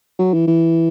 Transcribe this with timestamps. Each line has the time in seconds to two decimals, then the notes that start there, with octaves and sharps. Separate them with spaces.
0.19 F#3
0.34 E3
0.47 E3